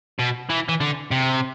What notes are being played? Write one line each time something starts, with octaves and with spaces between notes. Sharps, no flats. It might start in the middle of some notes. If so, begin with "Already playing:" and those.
B2
E3
E3
D3
C3